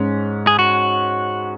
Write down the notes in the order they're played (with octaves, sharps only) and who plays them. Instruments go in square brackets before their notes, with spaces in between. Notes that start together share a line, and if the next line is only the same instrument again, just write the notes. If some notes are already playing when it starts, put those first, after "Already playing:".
Already playing: [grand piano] G#2 G#3 C#4
[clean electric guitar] G#4
F#4